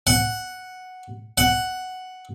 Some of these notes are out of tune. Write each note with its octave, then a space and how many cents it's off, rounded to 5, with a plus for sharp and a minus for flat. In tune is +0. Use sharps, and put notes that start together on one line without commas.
F#5 +0
F#5 +5